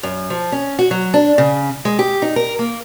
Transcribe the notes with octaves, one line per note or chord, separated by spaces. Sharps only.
F#2
F3
C#4
F#4
F#3
D4
C#3
G#3
G4
D#4
A#4
A#3